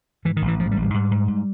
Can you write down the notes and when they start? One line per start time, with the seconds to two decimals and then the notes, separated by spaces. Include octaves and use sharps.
0.25 G#2 E3
0.37 D#3
0.42 A1
0.48 E3
0.60 G#2 F3
0.72 G3
0.76 A1
0.82 G3
0.94 G#2 G3
1.11 G#2
1.28 G#2